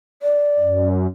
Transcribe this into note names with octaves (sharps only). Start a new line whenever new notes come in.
D5
F#2